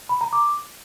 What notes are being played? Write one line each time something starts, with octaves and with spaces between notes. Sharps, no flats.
B5
A#5
D6